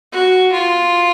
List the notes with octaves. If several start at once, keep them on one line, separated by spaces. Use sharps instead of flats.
F#4
F4